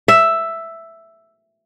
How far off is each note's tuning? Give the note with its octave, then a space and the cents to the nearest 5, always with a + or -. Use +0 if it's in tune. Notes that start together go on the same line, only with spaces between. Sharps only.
E5 +5